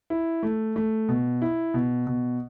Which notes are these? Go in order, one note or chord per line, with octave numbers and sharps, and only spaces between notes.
E4
A3
A3
B2
E4
B2
B2